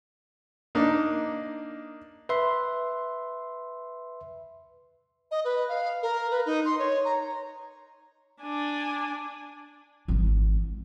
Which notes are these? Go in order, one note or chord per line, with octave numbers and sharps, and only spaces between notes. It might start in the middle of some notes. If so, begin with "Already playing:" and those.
A#3 D4 D#4
B4 E5 C6
D#5
B4
F5
A#4
B4
D#4
C6
C#5
A#5
D4 G#5
G#1 E3